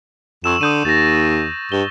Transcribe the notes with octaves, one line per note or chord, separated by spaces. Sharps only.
F2 C#6 E6 E7
D3 D#6 G6 D#7
D#2 A6 A#6
G2 G7